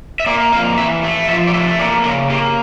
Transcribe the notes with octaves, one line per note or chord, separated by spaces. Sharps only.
E5
A#3 D5
F2 F5
E3 E5
A3
F3 E5
D5
A3 E5
A#3 D5
C#3 A#4
A#3 G4